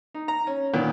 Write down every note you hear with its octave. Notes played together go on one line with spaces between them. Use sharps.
D#4
A#5
C#4
A#2 D#3 B3